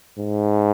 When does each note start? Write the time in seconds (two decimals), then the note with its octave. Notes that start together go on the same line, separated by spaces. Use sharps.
0.18 G#2